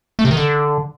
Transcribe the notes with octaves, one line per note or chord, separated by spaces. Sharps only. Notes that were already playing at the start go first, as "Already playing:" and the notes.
A3
C3
D#3
D3